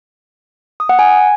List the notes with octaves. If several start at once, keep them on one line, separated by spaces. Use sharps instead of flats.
D#6
F#5
G#5